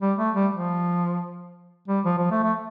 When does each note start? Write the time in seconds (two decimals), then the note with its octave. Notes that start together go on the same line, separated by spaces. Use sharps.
0.02 G3
0.18 A3
0.35 G3
0.52 F3
1.88 G3
2.05 F3
2.18 F3
2.31 A3
2.43 A3